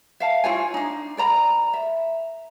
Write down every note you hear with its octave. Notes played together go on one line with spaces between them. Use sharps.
E5 F5 A5
E4 F4 C#5 G#5
D4 D#4
A#4 D5 A#5 B5
E5